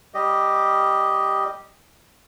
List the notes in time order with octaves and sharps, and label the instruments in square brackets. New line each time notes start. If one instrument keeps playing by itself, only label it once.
[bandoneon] G3 G4 D#5